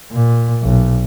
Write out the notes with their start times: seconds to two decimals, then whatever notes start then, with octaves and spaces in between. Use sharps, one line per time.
0.12 A#2
0.63 B1